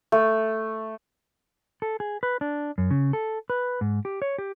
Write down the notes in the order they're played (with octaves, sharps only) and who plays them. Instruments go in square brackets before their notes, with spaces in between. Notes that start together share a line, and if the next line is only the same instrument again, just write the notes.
[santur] A3
[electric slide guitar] A4
G#4
B4
D4
F#2
C#3
A4
B4
G#2
G4
C#5
G4